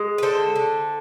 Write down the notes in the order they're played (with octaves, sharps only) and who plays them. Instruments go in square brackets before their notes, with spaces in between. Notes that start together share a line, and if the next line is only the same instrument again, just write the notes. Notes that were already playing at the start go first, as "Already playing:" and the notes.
Already playing: [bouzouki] G#3
B4
D3 A4 C5
D3